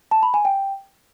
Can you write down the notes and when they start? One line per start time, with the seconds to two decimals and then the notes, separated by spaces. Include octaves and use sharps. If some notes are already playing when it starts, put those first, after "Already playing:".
0.11 A5
0.23 B5
0.34 G#5
0.45 G5